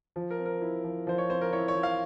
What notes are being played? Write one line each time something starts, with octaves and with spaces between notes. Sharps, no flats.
F3
A#4
C4
A#4
E4
F3
F3 C5
C#5
C4 C5
A#4
E4 C#5
C#5
F3
F5